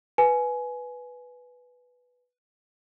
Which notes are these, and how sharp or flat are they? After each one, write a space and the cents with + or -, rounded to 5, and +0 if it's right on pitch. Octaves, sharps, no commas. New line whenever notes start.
B4 +0 G#5 +20